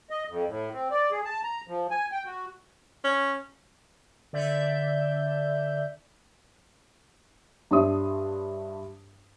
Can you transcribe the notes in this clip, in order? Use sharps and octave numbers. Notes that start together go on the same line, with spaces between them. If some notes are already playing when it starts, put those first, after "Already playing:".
D#5
F2
A2
C4
D5
G#4
A5
A#5
F3
G#5
G5
F#4
C#4
D3 D5 E5 G6
G2 D4 C#5 E5 C6 D#6